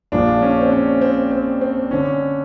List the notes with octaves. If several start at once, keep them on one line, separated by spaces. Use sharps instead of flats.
A#1 A#2 F3 D4
C#4
C4
C#4
C4
C4
C4
D3 C#4